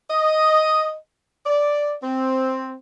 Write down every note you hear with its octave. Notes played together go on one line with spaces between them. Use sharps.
D#5
D5
C4